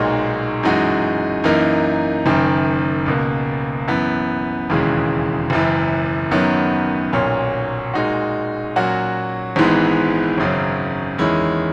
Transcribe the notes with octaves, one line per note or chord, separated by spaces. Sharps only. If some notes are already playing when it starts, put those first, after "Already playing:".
Already playing: B1 A#2 G#3 D#4 F#4
F#2 E3 G#3 D#4 F#4
F#2 E3 A#3 D#4
F#1 F#2 D#3
C#2 B2 A#3
F#2 E3 B3
E1 D#2 C#3 E3 G#3
F#1 F#2 E3
F#2 D#3 F#3 B3
B1 A#2 F#3 C#4
A#2 G#3 D#4 F#4
A#2 F#3 C#4 F#4
G#1 G#2 E3 G#3 B3
G#1 F#2 C#3 F#3
E2 D#3 G#3 C#4 E4